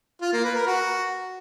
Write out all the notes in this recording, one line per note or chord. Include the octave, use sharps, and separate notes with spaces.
F4
A#3
B4
A#4
F#4